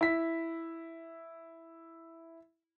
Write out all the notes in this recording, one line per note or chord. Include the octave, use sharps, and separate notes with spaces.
E4 B6